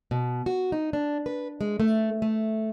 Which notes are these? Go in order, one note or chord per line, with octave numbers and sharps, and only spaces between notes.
B2
F#4
D#4
D4
B4
G#3
A3
A3